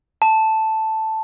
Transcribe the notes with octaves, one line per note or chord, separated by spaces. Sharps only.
A5